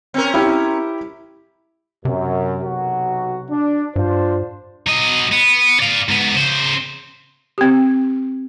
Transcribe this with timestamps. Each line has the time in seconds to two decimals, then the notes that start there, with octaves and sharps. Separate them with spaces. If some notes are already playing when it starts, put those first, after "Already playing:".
0.14 C4 C#4 A#4
0.34 E4 G4
2.05 F#2 C3
2.64 B1 F#3 F#4
3.50 D4
3.96 G2 D4 F4 C5
4.87 F#3 D#5
5.32 B3
5.80 D5 F5
6.08 G#2 B3
6.34 C#3 C5
7.58 C4 G4